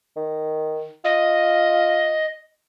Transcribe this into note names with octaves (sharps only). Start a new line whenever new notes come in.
D#3
F4 D#5